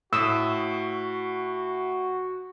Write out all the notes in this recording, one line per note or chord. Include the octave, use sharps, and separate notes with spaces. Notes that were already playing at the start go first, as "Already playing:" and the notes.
A2 F#4 D#6 E6